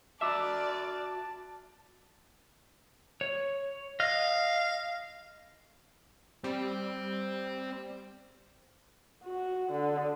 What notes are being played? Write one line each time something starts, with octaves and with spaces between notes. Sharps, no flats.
F#4 D5 E5 A5 D6 E6 E7
C#5
D#5 F5 F6
G3 C4 C5
F#4
D3